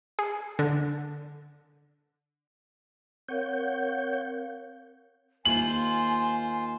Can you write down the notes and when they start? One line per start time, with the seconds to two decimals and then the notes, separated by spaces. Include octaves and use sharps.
0.19 G#4
0.59 D3
3.29 C4 A#4 C#5 F5 F#5 G6
5.45 D#2 F4 C5 G#5 F#7